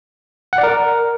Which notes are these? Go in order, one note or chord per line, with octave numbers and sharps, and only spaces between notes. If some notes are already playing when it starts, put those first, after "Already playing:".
F#5
D5
A#4